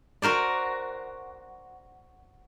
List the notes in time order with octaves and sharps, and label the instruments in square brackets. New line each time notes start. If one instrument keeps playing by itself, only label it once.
[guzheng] F#4 A#4 C5 D5